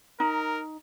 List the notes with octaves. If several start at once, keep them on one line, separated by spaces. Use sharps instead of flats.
D#4 A#4